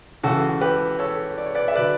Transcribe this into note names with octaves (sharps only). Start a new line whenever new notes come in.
C#2 C#3 E3 F#4 A4
G4 B4
A4 C#5
D5
C#5
B4 D5
E5
D3 F#3 B4 D5